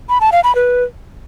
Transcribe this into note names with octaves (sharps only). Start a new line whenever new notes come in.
B5
A5
F5
B5
B4